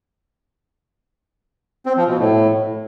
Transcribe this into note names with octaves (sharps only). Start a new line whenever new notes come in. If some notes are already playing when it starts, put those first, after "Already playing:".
C4
F3
B2
A2